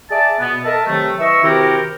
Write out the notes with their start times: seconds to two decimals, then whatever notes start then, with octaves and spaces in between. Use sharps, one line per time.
0.10 G#4 D5 E5 A5
0.40 B2 B3
0.64 A4 A#4 D#5 E5 A5 E6
0.86 C3 D#3 F#3 A3
1.19 E3 D#5 E5 C#6 E6
1.43 C3 D#3 E4 F#4 G4 A#4